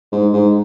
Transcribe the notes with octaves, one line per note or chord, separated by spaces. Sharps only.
G#2
G#2